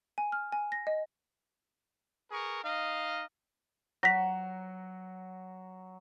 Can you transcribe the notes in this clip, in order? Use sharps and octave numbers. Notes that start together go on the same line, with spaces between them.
G#5
F6
G#5
A#6
D#5
G#4 A#4 B4 C#6
D#4 D#5 F5
F#3 A#6 B6